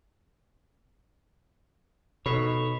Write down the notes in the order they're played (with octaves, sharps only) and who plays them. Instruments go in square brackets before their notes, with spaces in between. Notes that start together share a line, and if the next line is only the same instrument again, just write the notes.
[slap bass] B2 [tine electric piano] D#4 A4 [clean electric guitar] C#5 [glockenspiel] B5 B6 E7